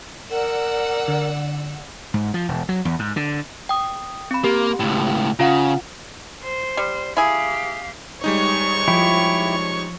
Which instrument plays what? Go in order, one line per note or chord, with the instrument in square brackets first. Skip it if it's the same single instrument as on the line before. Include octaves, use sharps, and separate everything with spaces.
[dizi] A#4 [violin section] D5 F#5 E6
[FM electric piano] D3
[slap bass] G#2
F3
E1
F#3
E2
G#2
D3
[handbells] G5 D#6
C4 B5
[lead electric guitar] A#3 [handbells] G4
[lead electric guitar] C#2 A2
[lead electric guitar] C#3 [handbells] F4 F5 F#5
[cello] C5
[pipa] G3
[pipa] E4 G#4 [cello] G4 F5
[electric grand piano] G3 G#3 D#4 [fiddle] C#5 C#6
[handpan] F3 [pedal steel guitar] E4 G4